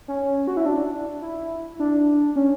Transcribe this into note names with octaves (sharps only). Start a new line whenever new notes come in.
C#4
F#4
E4
D4
E4
D4
C#4